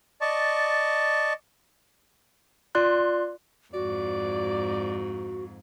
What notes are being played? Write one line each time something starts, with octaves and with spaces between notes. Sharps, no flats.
D5 D#5 A5 C#6
F4 D5 C6 F#6
F2 G#2 F#4 D5